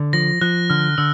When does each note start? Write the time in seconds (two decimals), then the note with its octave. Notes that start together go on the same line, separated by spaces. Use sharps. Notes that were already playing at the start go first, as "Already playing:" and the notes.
Already playing: D3
0.13 F3 A#6
0.41 F3 F#6
0.70 D3 F6
0.98 D3 E6